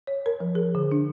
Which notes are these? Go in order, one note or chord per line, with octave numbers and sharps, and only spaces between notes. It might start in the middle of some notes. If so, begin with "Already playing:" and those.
C#5
A#4
F3
G#4
D3
D4